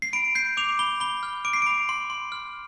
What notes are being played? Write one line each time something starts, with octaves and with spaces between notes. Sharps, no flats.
C7
B5 D7
G6 C7
D6 F7
B5 G7
B5 G7
F6
D6 D7
C7
B5 D7
C6
C6
F6